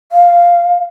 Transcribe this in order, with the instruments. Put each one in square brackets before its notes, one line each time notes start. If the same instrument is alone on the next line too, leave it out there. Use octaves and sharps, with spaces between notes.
[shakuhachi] F5